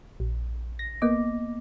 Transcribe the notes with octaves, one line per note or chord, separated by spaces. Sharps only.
A#1
A#6
A#3 B3 D#5 D6